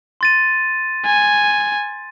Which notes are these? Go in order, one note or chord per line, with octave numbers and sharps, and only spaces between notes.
C6 A6 D#7
G#5